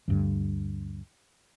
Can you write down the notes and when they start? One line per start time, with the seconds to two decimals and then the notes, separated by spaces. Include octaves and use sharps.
0.08 D2 G2 D3